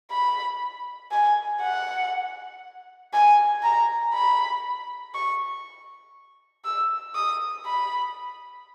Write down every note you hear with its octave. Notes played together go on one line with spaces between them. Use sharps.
B5
G#5
F#5
G#5
A#5
B5
C#6
E6
D#6
B5